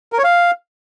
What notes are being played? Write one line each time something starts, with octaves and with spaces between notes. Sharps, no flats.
A#4
C#5
F5